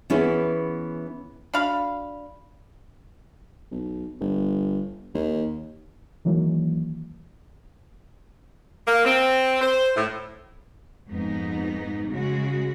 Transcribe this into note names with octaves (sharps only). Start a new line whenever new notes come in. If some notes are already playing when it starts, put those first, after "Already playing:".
E3 B3 C#4 E4 G#4
D4 F#4 F5 B5
B1
G1
D#2
D#3 E3 F#3 G#3 A#3
A#3
C4
C5
A2
F2 G#2 B3 D#4
C#3 G#3 F#4